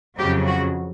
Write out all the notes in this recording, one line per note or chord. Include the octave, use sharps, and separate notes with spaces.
F2 C#3 F#3 G4
F#4